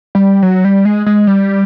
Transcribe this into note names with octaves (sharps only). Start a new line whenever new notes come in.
G3
F#3
G3
G#3
G#3
G3